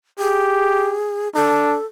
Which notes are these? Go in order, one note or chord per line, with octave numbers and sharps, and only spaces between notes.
G4 G#4
D4 A4